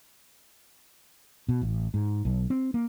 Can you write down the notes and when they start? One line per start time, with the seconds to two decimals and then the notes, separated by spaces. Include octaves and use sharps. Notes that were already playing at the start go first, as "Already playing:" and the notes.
1.49 B2
1.62 A1
1.94 G#2
2.25 B1
2.50 C4
2.74 A#3